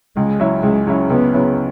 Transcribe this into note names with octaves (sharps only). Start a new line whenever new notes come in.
C#2 G#3
C#3 F#3 C#4 E4
C#2 G#3
C#3 F#3 C#4 E4
C#2 B3
C#3 F#3 C#4 E4